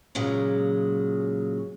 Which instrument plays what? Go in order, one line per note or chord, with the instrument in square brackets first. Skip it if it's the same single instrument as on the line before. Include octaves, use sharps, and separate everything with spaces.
[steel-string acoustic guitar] A#2 C#3 F#3 G#3